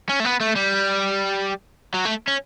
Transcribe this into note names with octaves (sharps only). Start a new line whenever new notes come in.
C#4
A3
B3
A3
G3
F#3
A3
C#4